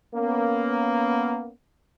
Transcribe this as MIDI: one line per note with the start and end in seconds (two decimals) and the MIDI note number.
0.16 1.51 58
0.16 1.51 59
0.16 1.51 61